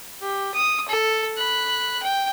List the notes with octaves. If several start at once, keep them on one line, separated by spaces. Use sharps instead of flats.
G4
D#6
A4
B5 F#6
G5